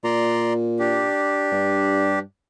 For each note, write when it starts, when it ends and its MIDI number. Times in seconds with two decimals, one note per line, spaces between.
0.04 1.08 46
0.04 0.53 74
0.04 0.53 82
0.04 0.53 84
0.79 2.19 62
0.79 2.19 67
1.52 2.21 43